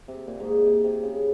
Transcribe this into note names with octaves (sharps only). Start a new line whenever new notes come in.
C3
A#2
G#2
A#2
C3
C3
C#3